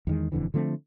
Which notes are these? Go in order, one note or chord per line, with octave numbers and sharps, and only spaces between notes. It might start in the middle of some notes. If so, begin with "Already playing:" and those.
E2 D#3 G#3
E1 F2 D3 E3
D3 F3 A3 C4